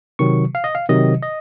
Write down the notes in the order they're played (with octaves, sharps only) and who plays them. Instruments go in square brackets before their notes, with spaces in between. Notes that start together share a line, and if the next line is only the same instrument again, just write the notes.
[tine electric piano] C3 D#3 F#3 C#6
F5
D#5
F5
C3 D#3 F#3 D#5
D#5